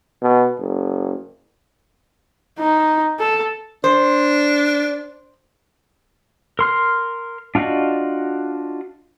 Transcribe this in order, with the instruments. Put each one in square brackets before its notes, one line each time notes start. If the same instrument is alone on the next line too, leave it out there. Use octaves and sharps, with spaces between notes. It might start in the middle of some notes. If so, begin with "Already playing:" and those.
[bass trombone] B2
F#1
[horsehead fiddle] D#4
A4
[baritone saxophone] D4 [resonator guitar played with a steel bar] C5
[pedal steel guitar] A#4 C6 F6
D4 F4 F#4 D5 D#5